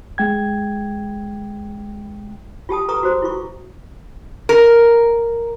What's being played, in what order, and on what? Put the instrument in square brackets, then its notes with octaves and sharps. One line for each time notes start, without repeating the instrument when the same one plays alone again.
[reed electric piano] G#3 G5 G#6
[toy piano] F4 G4 A5 D#6
A4 B4 A#5 C#6 D#6
F#4 C5 D6
E4 F4 C#6
[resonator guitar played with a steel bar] A#4